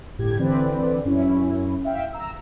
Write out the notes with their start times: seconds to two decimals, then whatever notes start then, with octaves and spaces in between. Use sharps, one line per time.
0.18 G1 A2 G4 G#6
0.39 D3 E3 C4 B4 D5
1.04 F#2 C#4 E4
1.85 E5 F5 G5
2.13 A#5 E6